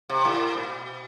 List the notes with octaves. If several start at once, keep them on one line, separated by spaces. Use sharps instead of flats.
C3
A2
B2